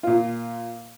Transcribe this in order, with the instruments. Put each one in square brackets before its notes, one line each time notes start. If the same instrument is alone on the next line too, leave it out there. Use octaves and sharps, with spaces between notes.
[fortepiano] A#2 F4